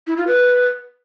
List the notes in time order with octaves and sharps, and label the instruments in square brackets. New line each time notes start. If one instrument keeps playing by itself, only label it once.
[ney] E4
F4
B4